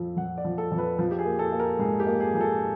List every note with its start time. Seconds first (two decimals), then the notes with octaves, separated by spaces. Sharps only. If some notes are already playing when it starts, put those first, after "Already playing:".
Already playing: F2 F3
0.17 F3 F#5
0.38 D5
0.45 F3
0.58 A4
0.72 F2
0.78 B4
0.99 F3
1.11 G4
1.19 G#4
1.25 A#3
1.39 A4
1.52 A#3
1.60 A#4
1.79 G#2 G#4
2.00 G4
2.06 A#3
2.20 G#4
2.34 F3 G#4
2.41 A4